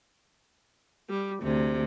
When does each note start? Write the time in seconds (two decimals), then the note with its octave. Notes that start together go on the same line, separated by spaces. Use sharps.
1.09 G3
1.41 D2 C3